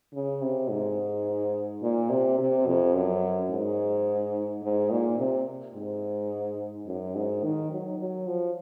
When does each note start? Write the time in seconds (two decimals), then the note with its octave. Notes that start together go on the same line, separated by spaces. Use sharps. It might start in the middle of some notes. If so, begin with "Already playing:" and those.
0.14 C#3
0.42 C3
0.70 G#2
1.82 A#2
2.10 C3
2.38 C3
2.67 F2
2.94 F#2
3.51 G#2
4.63 G#2
4.91 A#2
5.18 C3
5.74 G#2
6.87 F#2
7.15 G#2
7.43 D#3
7.71 F#3
7.99 F#3
8.27 F3